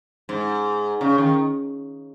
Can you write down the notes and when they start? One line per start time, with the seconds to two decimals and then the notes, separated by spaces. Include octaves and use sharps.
0.29 G#2
1.01 C#3
1.18 D#3